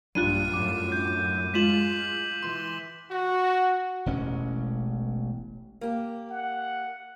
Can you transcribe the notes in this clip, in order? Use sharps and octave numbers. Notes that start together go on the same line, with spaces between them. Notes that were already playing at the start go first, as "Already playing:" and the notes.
A#1 G2 G3 D4 F4 F#6 D#7
F#2 A2 D6 D#7
G6
G#3 F4 B6 E7 F#7
E3 C6
F#4
E1 A1 C#4
A#3 G4
F#5